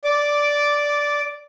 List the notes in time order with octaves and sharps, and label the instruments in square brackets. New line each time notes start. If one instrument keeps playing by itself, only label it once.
[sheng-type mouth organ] D5 D6